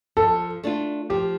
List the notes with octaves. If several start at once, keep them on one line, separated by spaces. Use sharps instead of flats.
F3 A4
A3 D4 F4
F3 G4